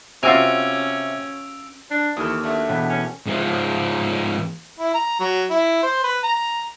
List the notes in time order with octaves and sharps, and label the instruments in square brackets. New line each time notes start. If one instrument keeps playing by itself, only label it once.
[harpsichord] C3 [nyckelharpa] C#4 [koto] F4 F#4 G#5 [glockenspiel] E6 D7 F7
[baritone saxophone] D4
[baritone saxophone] D#2 [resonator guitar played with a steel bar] E3 A4 [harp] D#6 F6
[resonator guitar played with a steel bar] F#3 A3 D4
[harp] E1 B3
[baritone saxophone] C#4
[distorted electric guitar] G#2 F3
[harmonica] E4
A#5
F#3
E4
C5
B4
A#5